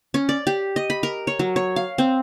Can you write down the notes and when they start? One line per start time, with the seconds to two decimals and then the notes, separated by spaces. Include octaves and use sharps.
0.14 C#4
0.29 D5
0.47 G4
0.76 D#5
0.90 B5
1.03 A#4
1.27 C#5
1.39 F#3
1.56 C#5
1.76 F5
1.98 C4